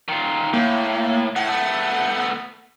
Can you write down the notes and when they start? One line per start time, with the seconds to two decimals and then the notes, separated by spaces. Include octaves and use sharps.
0.09 D#3 F4
0.53 A2 A#3
1.36 A2 F#5
1.49 A3 B3